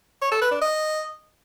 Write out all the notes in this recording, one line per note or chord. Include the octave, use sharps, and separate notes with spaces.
C#5
A4
B4
D4
D#5